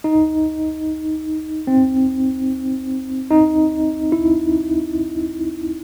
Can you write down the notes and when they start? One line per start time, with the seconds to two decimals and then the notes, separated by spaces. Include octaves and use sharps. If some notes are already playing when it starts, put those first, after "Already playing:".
0.04 D#4
1.67 C4
3.31 D#4
4.12 E4